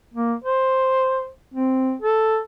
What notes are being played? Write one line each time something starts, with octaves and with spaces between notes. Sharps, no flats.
A#3
C5
C4
A4